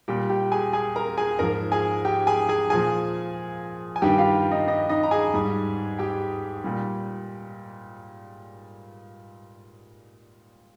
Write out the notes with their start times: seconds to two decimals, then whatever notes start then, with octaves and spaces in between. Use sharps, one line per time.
0.08 A#2 G3 G4 G5
0.30 G4 G5
0.52 G#4 G#5
0.73 G#4 G#5
0.96 A#4 A#5
1.17 G#4 G#5
1.39 G#2 F3 A#4 A#5
1.72 G#4 G#5
2.05 G4 G5
2.27 G#4 G#5
2.49 G#4 G#5
2.70 A#2 F3 G#4 G#5
3.96 G#5
4.02 G2 D#3 G3 G4 G5
4.18 F4 F5
4.52 D#4 D#5
4.68 D#4 D#5
4.89 D#4 D#5
5.03 A#5
5.11 G#4 G#5
5.33 G#2 G3
5.98 G4 G5
6.64 A#2 G3